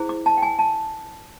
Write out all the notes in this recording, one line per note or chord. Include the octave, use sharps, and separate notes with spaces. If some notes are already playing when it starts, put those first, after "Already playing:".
Already playing: E4 G#4 C5
D6
A5
G5
G#5
A5